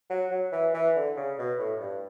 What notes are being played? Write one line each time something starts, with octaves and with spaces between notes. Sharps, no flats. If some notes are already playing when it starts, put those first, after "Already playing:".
F#3
F#3
E3
E3
D3
C#3
B2
A2
G2